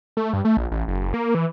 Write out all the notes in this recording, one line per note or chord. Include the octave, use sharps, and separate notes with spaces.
A3
G2
A3
A#1
A1
F#1
F#1
A#3
E3